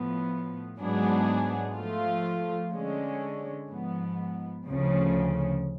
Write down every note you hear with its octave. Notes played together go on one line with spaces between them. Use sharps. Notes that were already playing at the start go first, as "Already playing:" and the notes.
Already playing: A2 F3 B3
G#2 F#3 B3 D4 G#4
F3 A3 F4
D3 G#3 C#4
G#2 F3 B3
D2 C#3 F3